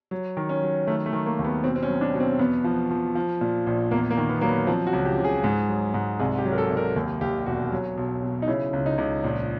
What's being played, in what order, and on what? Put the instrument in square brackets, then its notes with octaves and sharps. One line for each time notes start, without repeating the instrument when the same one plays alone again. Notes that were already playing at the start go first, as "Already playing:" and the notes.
[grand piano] F#3
D#3
C#4
F#3
D#3 A3
A3
D#3
A#3
D#2
B3
B2 C4
C4
C#4
F#3
D4
B2
C4
E2 B3
F3
F3
F3
A#2
A#1
E2 A#3
A#3
D#3
B3
F#3 A#3
B3
F3 C4
F#4
C#2
G4
C#3
G#4
G#2
F#3
G#2
C2 G#4
G4
F#3
A#4
A4
C2
A#4
D#2
D#2 G4
E1 F#4
F#3
B1
B2
D#4
C#3 E4
C#2
D#4
C#2
A#1